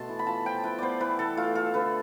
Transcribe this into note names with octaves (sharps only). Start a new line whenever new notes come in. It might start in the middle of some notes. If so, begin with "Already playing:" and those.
Already playing: B2 A3 B3 A5 C6
E3
B5
F4 A5
F3 G5
E4 B4
B3 C5 D5
E3 B4
E3 A4
A3 F4
F4 A4
D3 B4